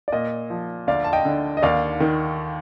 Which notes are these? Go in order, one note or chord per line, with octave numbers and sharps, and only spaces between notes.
D5
A#2 D#5
F3
D2 D5 F5
A5
D#5 G5
D3
D#5
D#2 D5 F5
D#3